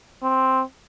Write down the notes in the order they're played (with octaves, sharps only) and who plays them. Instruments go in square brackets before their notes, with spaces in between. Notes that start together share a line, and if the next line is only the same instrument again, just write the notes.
[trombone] C4